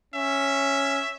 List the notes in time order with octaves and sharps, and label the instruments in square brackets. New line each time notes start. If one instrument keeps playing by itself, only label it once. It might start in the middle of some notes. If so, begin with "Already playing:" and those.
[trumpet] C#4 [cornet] E5